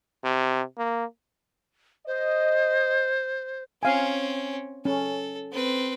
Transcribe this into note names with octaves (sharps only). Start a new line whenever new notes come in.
C3
A#3
C5 D#5
C4 C#4 F5 G#5
C#4 A4
C4 B4